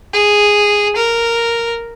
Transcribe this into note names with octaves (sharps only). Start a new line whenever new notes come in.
G#4
A#4